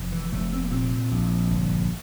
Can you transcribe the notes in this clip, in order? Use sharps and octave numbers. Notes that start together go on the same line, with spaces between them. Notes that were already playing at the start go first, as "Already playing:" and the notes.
Already playing: F1
E3
F1 A3
C4
A#3
A#2 C4
A#1
G1